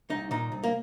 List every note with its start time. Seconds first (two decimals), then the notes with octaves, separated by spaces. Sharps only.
0.10 C2 D#4
0.31 A#2 D#4
0.52 C2
0.64 A#3